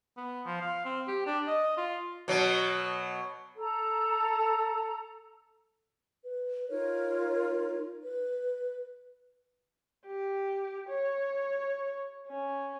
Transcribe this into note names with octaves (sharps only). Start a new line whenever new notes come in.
B3
F3
F5
C4
G4
D4
D#5
F4
B2 F#3
A4 A#5
B4
D#4 F4 A#4 C#5
B4
G4
C#5
C#4